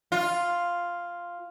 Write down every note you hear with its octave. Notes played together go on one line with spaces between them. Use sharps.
F4